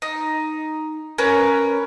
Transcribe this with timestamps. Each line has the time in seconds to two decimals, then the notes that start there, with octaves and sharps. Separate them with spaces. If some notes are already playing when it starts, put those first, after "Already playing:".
0.02 D#4
1.18 C#4 A#4 B4